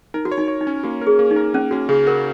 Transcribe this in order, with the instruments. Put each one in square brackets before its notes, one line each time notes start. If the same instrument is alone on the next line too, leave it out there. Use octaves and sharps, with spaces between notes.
[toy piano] D#4 [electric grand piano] A#4
[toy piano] F#4
[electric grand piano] C#5
[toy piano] D#4
[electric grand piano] C#5
[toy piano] D#4
[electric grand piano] C#4
[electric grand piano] A#3 [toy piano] F#4
[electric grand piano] A#4
[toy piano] G#4
[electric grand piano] A#3
[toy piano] D#4
[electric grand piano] A#4
[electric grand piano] A#3 [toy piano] C#4
[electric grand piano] C#4 [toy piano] F#4
[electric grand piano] C#3 [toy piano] G#4
[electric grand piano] F#4 [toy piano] A#4